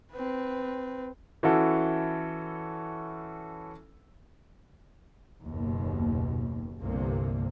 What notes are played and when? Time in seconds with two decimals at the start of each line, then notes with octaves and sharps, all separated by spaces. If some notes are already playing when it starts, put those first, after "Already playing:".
0.13 C4 B4
1.43 E3 C#4 E4 F#4 A4
5.42 F#1 D#2 B2
6.79 G1 C2 G2 C3 A#3